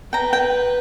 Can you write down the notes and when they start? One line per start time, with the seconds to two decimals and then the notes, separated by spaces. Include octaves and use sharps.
0.13 B4 G5 A#5
0.33 G5